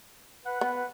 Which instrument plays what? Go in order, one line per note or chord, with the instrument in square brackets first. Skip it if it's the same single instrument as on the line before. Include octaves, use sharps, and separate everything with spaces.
[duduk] B4 [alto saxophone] F#5
[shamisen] B3 [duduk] B4